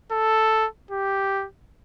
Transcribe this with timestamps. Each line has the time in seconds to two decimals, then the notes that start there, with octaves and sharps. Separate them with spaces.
0.12 A4
0.91 G4